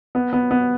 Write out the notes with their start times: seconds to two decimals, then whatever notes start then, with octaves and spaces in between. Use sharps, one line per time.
0.15 B3
0.33 B3
0.51 B3